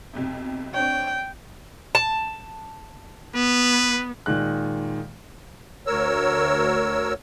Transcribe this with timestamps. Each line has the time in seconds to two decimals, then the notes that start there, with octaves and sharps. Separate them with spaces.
0.13 B1 F2 C3
0.74 C4 D4 C#5 G5
1.95 A5
3.35 B3 B4
4.26 A#2 D#3 G#3 F#6
5.87 D2 A#4 C#5 E6